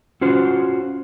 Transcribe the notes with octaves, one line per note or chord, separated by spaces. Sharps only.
C#4 F4 F#4 C5